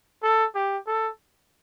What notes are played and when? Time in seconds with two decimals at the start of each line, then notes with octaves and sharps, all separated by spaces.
0.23 A4
0.55 G4
0.87 A4